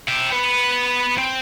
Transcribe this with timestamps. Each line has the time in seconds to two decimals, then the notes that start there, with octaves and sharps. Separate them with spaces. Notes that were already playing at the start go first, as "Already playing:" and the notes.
0.08 E5 G5
0.31 B3 B4
1.18 C4